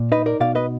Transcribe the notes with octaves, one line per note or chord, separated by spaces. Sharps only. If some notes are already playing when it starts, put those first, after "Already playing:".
Already playing: A#2
D#4 B4 D#5
A#4 D5
B2 D5 F5
B4 D#5